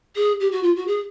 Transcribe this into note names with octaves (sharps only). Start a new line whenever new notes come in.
G#4
G4
F#4
F4
F#4
G#4